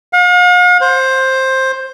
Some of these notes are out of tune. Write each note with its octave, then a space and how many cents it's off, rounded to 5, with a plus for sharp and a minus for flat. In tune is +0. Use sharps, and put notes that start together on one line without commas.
F5 +45
C5 +10